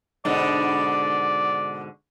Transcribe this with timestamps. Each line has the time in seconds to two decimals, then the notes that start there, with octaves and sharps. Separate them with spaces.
0.25 G#2 B2 D3 D5